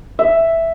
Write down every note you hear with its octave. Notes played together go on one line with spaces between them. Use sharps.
E5